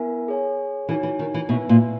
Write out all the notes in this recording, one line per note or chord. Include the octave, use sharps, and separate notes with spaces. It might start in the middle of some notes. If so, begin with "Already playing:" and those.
Already playing: B3 E4 A#4 E5 G#5
G#4 C#5 G#5
E3 D#4 F#4 C#5 G#5
E3
D#3
E3
B2 E4 B4 E5 G#5
A#2